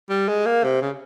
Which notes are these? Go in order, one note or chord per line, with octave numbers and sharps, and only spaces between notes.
G3
G#3
A#3
C3
C#3